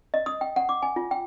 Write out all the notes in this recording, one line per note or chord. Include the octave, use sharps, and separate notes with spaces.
D#5
D#6
G5
F#5
D6
G#5
F4
G5